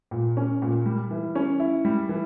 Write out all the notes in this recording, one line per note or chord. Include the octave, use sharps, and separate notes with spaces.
A#2
C#4
A#2
G3
E3
C#4
E4
G3
E3